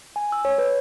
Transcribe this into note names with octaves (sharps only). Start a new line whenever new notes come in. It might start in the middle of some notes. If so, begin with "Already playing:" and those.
G#5
E6
C#5
B4